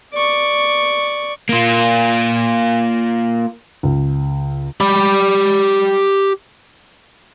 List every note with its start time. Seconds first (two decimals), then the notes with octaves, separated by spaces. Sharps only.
0.14 D5 C#6
1.49 A#3 F4
3.83 C#2
4.81 G4 B5